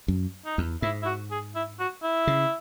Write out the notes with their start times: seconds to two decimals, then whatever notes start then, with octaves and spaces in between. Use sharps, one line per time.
0.08 F#2
0.45 D#4
0.58 E2
0.82 G#2 E4
1.02 E4
1.06 F#4
1.31 G#4
1.55 E4
1.80 F#4
2.03 E4
2.27 C#3